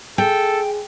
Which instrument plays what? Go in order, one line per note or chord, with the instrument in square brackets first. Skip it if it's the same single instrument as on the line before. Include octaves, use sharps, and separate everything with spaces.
[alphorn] G#4 [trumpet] A4 [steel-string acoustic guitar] G5